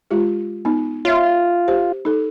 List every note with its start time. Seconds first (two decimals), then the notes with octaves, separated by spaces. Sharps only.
0.11 G#3 F4 G4
0.65 B3 D#4
1.05 F4 C#5 E5
1.68 G4 C5
2.05 D#4 A4